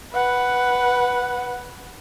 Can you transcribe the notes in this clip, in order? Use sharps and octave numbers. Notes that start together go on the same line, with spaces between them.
B4 F#5